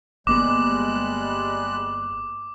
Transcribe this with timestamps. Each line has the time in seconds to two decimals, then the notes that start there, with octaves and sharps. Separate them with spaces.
0.27 G1 G3 G#3 A#3 B3 D6 F#6